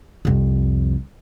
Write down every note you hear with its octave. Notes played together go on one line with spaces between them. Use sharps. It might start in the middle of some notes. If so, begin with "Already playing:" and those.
C2 F2